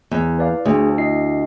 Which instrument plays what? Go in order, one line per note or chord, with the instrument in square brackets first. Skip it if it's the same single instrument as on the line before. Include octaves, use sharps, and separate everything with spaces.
[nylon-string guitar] E2
[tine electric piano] B4 D5 F5
[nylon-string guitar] D2 [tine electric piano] D4 G#4 C5
[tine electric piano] E4 D#5 C7